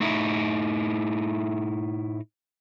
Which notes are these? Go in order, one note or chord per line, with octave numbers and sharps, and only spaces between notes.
A2 D#4 E4